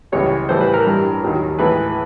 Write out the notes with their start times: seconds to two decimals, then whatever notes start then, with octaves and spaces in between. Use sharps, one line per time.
0.12 C#2 C#3 E3 G3 C#5
0.49 A2 E3 G3 C5
0.61 B4
0.74 A#4
0.86 G2 E3 G3
1.22 D#2 D#3 F#3
1.59 A2 E3 G#3 B4